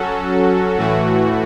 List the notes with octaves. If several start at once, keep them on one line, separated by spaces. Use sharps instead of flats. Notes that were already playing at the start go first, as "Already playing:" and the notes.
Already playing: F#3 C#4 F#4 A4
A2 E3 A3 F#4